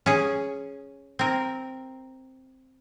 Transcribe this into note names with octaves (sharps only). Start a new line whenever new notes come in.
C#4 G#4
C4 A#4